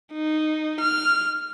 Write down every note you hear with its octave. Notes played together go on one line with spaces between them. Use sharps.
D#4
F6